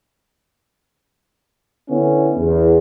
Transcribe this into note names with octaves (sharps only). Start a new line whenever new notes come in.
D3 B3 C#4 E4
E2